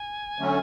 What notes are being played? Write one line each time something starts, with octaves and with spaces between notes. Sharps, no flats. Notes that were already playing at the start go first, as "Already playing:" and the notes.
Already playing: G#5
D3 F#3 A3 C#4